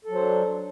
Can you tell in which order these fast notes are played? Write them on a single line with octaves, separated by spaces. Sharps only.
A4 F#3 C5 D4